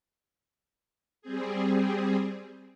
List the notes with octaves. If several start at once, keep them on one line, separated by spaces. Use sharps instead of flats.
G3 C4 G#4